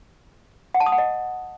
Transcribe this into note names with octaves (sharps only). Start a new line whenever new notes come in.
F#5
A5
D#6
F#5
D#5